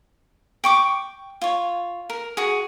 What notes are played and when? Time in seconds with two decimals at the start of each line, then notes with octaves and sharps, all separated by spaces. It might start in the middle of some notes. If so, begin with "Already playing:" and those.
0.64 G5 C#6 D6
1.41 F4 C#5
2.10 A#4
2.37 F#4 G#4